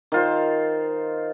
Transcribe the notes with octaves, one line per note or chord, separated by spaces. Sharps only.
D#3 F4 C5